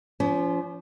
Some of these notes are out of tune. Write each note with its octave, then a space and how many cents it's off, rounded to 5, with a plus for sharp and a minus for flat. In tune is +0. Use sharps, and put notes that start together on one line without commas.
F3 -15 C#4 +40